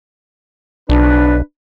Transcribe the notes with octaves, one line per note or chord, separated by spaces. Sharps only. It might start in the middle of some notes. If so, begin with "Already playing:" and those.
B1 D4 B4